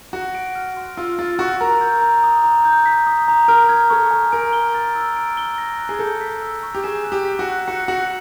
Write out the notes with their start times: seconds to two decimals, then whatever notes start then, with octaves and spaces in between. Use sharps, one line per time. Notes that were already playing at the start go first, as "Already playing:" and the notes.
0.13 F#4 A#6
0.35 D7
0.55 F6
0.77 C6
0.97 F4 E6
1.19 F4 A6
1.39 F#4 C#6
1.61 A#4 A#5
1.81 G6
2.02 A#5
2.23 D#6
2.44 A#5
2.65 G6
2.86 B6
3.07 D#6
3.28 A#5
3.48 A#4 F6
3.69 G#6
3.90 A4 C#6
4.11 G#5
4.32 A#4 D7
4.53 G7
4.74 A6
4.95 E6
5.16 D7
5.37 G7
5.58 A#6
5.79 F#6
5.89 G#4
5.99 A4 G6
6.21 B6
6.42 E6
6.63 C#6
6.75 G4
6.84 G#4 E7
7.04 F#6
7.12 G4
7.25 B6
7.39 F#4
7.46 F#6
7.68 F#4 C#7
7.88 F#4 F#7